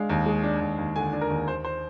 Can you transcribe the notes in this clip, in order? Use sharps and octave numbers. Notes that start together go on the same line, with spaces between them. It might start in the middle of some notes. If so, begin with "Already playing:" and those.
Already playing: G#3 D4 F5
D#2
G#3
D4
D#2
D#2
D3 G#5
D4
A#4
D#2
D#2 C5
C5